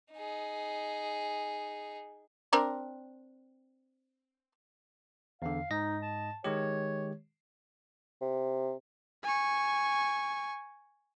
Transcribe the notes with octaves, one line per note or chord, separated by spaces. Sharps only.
D#4 G#4
C4 D4 A#4
E2 D3 F5
G#2 D#4 D#5 A#6
A5
D#3 G#3 G4 C#5
C3
G#5 C#6